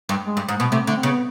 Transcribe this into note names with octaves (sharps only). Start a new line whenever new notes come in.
G2
G#3
G2
G#2
B2
C3 A3
D3 A3
C4
C#3 B3